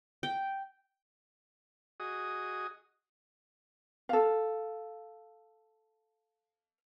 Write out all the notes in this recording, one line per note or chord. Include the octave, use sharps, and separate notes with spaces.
G5
F#4 G#4 D#5 D#6
A4 F5